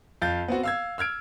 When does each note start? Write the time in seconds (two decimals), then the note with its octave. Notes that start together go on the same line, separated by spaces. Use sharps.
0.22 F2 F5 G6 A6
0.48 B3 C4 F#4
0.63 F5 E6 G#6
0.98 E6 F6 G#6 D7